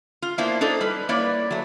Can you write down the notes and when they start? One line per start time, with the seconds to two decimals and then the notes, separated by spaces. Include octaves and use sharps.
0.22 F4
0.38 A#3 B3 D4 E4 F4 C5
0.61 D4 D#4 A4 C5
0.80 G3 B4
1.09 A#3 E4 B4 C#5 D5
1.51 F#3 A3